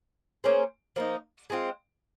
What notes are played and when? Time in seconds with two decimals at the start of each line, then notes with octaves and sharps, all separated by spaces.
0.44 A#3 C#4 G#4 C5
0.96 F3 A#3 D#4
1.50 G#3 C4 F4